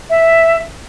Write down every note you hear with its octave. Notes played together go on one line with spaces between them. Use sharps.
E5